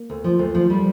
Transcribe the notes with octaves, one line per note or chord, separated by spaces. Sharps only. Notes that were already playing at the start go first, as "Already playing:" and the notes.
Already playing: A#3
D2
F3
D2
F3
G3